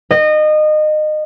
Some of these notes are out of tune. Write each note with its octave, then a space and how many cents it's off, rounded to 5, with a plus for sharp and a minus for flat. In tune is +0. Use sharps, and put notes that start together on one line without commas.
D#5 -25